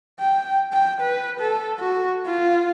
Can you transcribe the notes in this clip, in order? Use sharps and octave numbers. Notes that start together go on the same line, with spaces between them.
G5
G5
B4
A4
F#4
F4